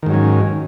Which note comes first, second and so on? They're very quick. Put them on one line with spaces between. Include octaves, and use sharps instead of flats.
D#3 G#2 F#3 C#4